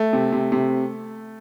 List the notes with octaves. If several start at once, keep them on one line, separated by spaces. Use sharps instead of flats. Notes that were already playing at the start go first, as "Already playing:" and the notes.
Already playing: A3
C3
C3
C3